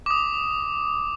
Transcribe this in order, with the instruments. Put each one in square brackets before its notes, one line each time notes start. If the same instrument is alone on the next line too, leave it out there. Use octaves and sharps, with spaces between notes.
[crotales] D6 D#6